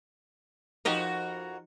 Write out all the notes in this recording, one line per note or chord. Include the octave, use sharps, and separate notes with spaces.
F2 F3 D#4 F#4 G4 A#4